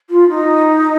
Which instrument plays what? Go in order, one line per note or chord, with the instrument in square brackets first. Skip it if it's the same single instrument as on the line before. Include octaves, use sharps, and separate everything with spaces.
[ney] F4
D#4